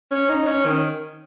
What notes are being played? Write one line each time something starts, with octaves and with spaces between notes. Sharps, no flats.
C#4
D#4
C#4
D#3